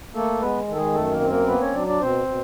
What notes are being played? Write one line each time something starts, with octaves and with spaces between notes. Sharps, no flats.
A3 A#3 A4
G#3 B3 B4
D#3 A4
G#3 G#4
F#2 A3 A4
A#3 A#4
C4
A#3 A#4
A#3 B3 B4
C#4 C#5
F#3 D4 D5
D4 D5
B2 C4 C5
B2